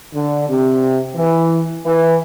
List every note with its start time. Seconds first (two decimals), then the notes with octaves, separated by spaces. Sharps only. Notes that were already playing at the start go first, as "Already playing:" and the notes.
0.14 D3
0.49 C3
1.15 E3
1.85 E3